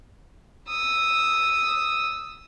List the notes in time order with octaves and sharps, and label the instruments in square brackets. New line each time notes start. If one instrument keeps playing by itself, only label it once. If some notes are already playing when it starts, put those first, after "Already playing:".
[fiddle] D#6 E6